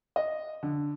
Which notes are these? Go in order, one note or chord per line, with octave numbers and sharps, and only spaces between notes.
D#5
D3